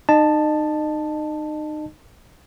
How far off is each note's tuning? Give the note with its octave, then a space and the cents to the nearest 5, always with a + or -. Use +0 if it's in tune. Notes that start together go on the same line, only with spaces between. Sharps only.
D#4 -25 D#5 -35 A5 +0